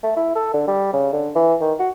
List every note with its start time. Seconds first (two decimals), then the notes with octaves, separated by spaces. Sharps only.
0.03 A3
0.17 E4
0.36 A4
0.54 D3
0.68 G3
0.93 C#3
1.13 D3
1.35 E3
1.61 D#3
1.79 F#4